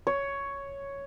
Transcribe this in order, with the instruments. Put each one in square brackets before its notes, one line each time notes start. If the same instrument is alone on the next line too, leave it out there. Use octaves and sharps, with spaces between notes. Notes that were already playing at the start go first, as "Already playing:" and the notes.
[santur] C#5